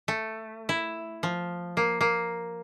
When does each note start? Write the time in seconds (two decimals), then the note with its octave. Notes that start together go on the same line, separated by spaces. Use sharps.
0.08 A3
0.69 E4
1.23 F3
1.77 A#3
2.01 A#3